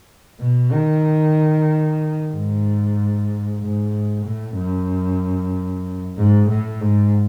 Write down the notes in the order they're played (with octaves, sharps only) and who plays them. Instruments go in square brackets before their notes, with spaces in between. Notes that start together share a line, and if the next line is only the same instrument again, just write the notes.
[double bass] B2
D#3
G#2
G#2
A2
F#2
G#2
A2
G#2